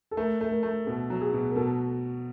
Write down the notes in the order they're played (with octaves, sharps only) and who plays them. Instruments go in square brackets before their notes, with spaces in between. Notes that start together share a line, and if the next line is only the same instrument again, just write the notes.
[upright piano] A4
[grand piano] A3 [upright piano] A#4
[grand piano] A3
[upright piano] A#4
[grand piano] A3
[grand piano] B2 [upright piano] A4
[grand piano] F#3
[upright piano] G#4
[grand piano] B2
[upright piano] A#4
[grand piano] B2 [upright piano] A4